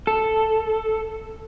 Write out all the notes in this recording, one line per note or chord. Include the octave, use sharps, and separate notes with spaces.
A4